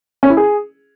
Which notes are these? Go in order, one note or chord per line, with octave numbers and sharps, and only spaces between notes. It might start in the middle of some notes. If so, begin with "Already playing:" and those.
C#4
E4
G#4